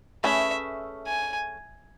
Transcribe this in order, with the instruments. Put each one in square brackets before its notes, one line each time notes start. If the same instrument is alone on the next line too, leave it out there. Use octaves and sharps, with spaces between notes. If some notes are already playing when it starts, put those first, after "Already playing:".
[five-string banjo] A3 C#4 G#4 B4 [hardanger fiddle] E5
[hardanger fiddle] G#5